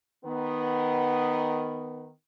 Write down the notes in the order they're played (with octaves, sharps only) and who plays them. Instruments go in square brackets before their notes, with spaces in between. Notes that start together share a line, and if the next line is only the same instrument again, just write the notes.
[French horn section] D#3 B3